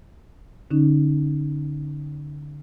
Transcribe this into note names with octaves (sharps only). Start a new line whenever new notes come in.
D3 C#4 D#4